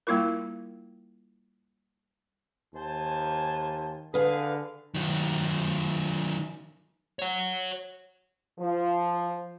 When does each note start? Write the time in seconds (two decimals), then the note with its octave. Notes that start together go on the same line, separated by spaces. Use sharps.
0.07 G3 A#3 E4 F4 A#4
2.74 D#2 C5 G#5 A5
4.14 D3 G#4 B4 F5
4.95 D#3 F#3
7.19 C#5 F#5
8.59 F3